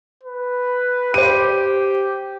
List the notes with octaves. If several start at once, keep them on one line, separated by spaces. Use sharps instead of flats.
B4
G4 C5 D#7